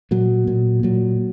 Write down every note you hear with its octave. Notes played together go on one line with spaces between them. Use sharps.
A#2 F#3
A#2
A#2 F#3